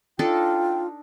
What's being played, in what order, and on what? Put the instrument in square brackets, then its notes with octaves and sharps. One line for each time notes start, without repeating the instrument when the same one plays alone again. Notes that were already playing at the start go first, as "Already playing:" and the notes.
[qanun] D4 D#4 A4 [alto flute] F4 [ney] G5